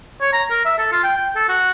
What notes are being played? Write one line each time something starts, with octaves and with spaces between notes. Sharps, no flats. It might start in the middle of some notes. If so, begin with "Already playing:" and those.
C#5
A#5
A#4
E5
A4
F4
G5
G5
A4
F#4